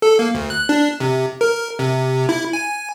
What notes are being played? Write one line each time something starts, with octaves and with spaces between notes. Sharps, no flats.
A4
A#3
D2
F#6
D4
C3
A#4
C3
E4
G#5